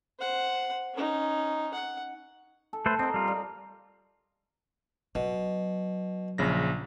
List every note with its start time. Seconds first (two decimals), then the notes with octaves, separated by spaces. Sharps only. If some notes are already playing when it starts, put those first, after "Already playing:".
0.19 C5 F#5
0.94 C#4 D#4
1.74 F#5
2.73 A4
2.86 A3 B4 C5
2.99 C4 A#4 D#5
3.14 G3 F4
3.28 A4 D5
5.15 B2 F#3
6.38 A#1 C#3 A#6